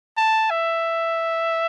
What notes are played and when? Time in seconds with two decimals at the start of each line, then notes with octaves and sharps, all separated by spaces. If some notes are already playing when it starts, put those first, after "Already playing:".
0.17 A5
0.50 E5